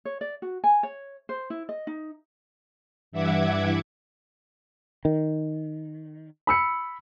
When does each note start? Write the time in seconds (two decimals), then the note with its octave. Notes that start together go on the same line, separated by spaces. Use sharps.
0.05 C#5
0.21 D5
0.42 F#4
0.64 G#5
0.83 C#5
1.29 C5
1.50 E4
1.69 D#5
1.87 D#4
3.12 G2 E3 E5 F#5 D6 G#6
5.05 D#3
6.47 B5 E6 C#7